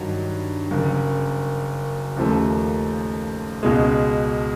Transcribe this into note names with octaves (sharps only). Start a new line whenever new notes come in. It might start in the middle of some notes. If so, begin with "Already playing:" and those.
Already playing: G2 D#3 F#3
F#1 F#2 C#3
D#2 C#3 F3 A3
C#2 B2 G#3